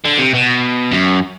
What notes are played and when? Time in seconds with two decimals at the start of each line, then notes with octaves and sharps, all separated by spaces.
0.05 D3
0.18 C3
0.34 B2
0.92 F#2